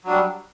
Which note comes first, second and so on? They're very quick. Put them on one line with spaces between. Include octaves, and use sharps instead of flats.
F#3 D4 G3